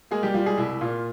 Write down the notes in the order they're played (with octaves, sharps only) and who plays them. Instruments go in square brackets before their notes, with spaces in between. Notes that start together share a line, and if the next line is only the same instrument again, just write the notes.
[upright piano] G#3 A#3 G#4
G3 G4
G3 F4
G#3 G#4
C2 E4
A#2 F4